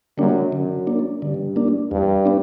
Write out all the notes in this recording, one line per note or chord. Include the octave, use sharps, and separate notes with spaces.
F#2 D3 G3 A#3 D4
F#2 D3
A#3 D4
G2 D3
A#3 D4
E2 G2
B3 D4